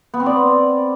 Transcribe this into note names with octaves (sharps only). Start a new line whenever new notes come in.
B3
C4
D5